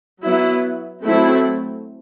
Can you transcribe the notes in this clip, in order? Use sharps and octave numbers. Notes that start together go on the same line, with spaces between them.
F#3 B3 E4
F#3 A3 C4 E4